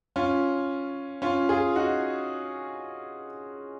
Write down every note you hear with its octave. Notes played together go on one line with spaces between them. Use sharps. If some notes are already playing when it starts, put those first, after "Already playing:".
C#4 F4
C#4 F4
F4 G#4
D#4 F#4